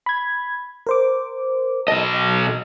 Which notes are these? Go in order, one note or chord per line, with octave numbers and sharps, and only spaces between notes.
B5 G#6
A#4 C5 D6
B1 D#5 A5